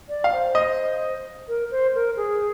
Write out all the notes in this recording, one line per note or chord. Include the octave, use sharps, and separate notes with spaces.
D5
F5
C5
D#5
A#4
C5
A#4
G#4